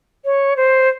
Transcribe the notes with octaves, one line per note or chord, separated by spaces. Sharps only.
C#5
C5